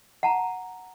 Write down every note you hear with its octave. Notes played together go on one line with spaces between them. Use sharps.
F#5 A5 A#5